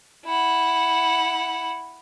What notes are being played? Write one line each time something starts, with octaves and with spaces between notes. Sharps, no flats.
E4 F#5